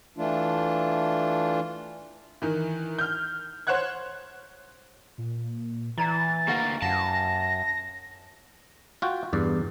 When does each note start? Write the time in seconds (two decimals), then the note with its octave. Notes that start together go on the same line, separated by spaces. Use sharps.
0.17 E3 A3 D4 F4
2.42 D#3 E3
2.99 F6 G6
3.67 C5 C#5 F#5 F#6 G#6
5.18 A#2
5.98 E3 E4 D5 A#5 A6
6.48 D2 A#3 G4 B4 F#5
6.82 F#2 F5 F#5 A5 A#6
9.02 F4 F#4 G5
9.33 E2 G2 D5